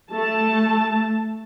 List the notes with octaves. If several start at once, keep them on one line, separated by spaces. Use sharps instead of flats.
A3 A5